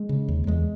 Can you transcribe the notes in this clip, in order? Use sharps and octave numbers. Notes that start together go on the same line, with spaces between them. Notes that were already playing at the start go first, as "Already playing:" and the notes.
Already playing: G#3
C#3
D#2
E2 G#3